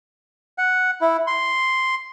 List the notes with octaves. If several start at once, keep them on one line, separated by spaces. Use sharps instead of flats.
F#5
E4
C6